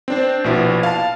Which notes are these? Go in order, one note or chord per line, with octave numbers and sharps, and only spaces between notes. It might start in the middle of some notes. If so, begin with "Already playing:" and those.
C4 D4 C5
A#1 B2 B3 E4
F5 A5